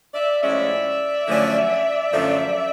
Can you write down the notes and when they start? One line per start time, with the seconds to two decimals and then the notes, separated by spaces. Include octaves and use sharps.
0.14 D5 E5
0.42 A2 F3 G#3 C#4 D5 E5
1.27 F#2 D3 F3 A3 C#4
2.12 F#2 D3 F3 A3 C#4